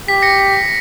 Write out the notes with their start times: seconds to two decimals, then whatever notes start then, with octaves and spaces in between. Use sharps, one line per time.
0.08 G4 B6
0.22 A#6 C#7